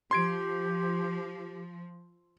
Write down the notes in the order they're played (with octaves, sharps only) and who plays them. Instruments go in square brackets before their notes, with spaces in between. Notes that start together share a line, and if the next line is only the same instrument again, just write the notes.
[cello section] F3 [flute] G4 [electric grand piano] C6 G#6 D7